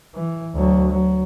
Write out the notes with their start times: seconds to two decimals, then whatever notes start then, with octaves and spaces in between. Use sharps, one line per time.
0.15 E3
0.55 D2 F#3
0.91 F#3